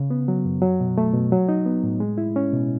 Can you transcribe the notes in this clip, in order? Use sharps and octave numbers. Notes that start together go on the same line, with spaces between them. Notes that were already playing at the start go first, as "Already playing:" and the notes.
Already playing: C#3
B3
F#3
F#2
F#3
B2
A3
B2
F#3
D#4
B3
A2
G#3
E4
C#4
B2